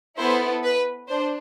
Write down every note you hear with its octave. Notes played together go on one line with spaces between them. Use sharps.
B3 E4 A4 C5
B4
D4 C5